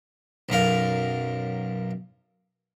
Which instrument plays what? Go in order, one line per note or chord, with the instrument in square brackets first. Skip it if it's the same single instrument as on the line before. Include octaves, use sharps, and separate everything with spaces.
[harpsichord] B1 F#2 A#4 F5